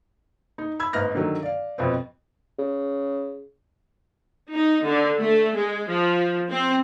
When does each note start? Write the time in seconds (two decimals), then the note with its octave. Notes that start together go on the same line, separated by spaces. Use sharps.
0.58 D#4
0.80 B5 E6 G#6
0.93 G#1 G#2 B4 F6 A#6
1.15 D3 D#3 F#3
1.43 D5 F5
1.78 F2 B2 B3 C4
2.59 C#3
4.53 D#4
4.84 D3
5.20 A3
5.57 G#3
5.91 F3
6.51 C4